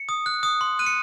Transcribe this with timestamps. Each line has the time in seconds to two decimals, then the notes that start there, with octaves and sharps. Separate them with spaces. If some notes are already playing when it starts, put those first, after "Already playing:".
Already playing: C#7
0.09 D#6
0.26 F#6
0.43 D#6
0.61 C6
0.79 F#6 D#7
0.86 C#7